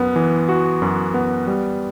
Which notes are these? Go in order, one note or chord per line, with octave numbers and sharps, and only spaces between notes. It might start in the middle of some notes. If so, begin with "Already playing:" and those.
Already playing: F#2 B3
E3
F#4
F#2
B3
G3